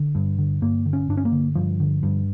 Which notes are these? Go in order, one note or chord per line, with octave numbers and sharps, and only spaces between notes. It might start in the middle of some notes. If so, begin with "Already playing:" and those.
Already playing: D3
G2
D3
G2 A#3
D3
C#4
G2 D4
C#4
A#3
D3
G2 F3
D3
G2